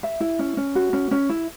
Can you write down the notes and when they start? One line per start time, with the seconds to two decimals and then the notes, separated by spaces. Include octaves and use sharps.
0.03 E5
0.20 E4
0.39 C#4
0.57 C#4
0.75 F#4
0.93 C#4
1.11 C#4
1.30 E4